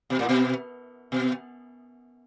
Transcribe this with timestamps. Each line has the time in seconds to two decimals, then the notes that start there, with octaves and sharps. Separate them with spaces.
0.10 B2
0.19 A2
0.29 B2
1.12 B2